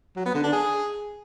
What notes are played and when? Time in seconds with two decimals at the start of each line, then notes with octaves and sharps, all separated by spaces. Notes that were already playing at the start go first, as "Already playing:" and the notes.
0.17 F#3
0.26 B3
0.35 D3
0.44 D4
0.53 G#4